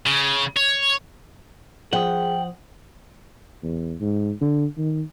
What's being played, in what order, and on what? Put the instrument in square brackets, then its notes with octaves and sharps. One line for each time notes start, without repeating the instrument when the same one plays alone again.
[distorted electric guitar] C#3
C#5
[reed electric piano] F3 C5 D#6 [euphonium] G#4 [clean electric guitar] F#5 [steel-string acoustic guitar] G5
[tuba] E2
G#2
D3
D#3